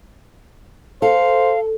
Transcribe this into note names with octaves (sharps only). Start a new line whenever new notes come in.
A4 C5 F5